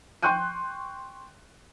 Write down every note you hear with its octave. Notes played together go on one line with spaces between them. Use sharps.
G5 C6 C#6 F#6 G6 D#7